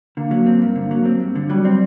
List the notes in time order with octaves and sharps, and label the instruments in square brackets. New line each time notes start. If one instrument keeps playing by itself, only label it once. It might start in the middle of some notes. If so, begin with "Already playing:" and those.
[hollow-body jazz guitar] D3 [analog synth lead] A#3
[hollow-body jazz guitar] F#3
C4
G2
D3
F#3
C4
G2
D3
[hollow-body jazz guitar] F#3 [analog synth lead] G3
[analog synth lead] G3 [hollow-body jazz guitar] C4